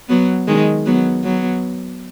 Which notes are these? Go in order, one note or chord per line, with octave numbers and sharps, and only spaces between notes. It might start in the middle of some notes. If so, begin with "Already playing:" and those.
F#3 B3
D#3 G#3
F#3 B3
F#3 B3